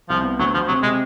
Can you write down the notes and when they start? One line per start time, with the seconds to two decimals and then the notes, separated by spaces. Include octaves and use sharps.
0.09 C2 F3
0.24 B3
0.39 D2 F#3
0.54 D2 F3
0.68 C3 F#3
0.83 C3 G#3